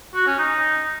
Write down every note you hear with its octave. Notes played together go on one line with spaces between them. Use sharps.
F#4
C#4
D#4